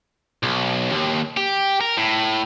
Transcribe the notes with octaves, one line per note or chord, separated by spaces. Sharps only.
B1
D#2
G4
A#4
A2